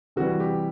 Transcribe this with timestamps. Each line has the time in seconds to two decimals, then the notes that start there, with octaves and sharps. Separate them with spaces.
0.16 C3 E3 G3 F#4
0.40 G4